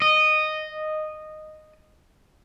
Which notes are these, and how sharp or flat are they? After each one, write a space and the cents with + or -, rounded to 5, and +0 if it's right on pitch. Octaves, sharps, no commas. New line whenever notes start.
D#5 -10